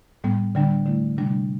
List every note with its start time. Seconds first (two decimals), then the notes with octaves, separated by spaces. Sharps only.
0.24 A2 G3 B3
0.55 D3 G3 D4
0.86 D3 A3 E4
1.17 C3 G3 D4